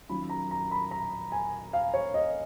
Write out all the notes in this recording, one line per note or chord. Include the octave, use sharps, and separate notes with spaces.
D#3 F#3 C#4 F4 B5
A#5
A#5
B5
A#5
G#5
F5
C#5
D#5